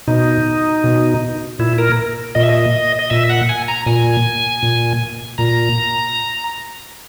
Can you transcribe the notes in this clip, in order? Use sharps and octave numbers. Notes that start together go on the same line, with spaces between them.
B2 D#4
B2
A#2 E4
A#4
A#2 D#5
E5
D#5
D#5
A#2 E5
F#5
G#5
A#5
A#2 G#5
A#2
A#2 A#5